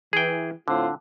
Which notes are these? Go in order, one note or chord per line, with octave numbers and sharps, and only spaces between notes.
E3 G#4 G5
A2 D3 C4 F4